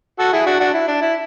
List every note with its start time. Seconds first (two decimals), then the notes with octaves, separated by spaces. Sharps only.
0.19 F#4 A4
0.33 E4 G#4
0.46 D4 F#4
0.60 D4 F#4
0.74 E4
0.88 D4
1.01 E4